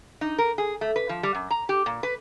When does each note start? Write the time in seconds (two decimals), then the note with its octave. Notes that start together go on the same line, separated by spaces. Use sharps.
0.21 D#4
0.38 A#4
0.58 G#4
0.81 A3
0.96 B4
1.09 F3
1.23 G3
1.35 F#2
1.51 A#5
1.69 G4
1.86 A#2
2.03 B4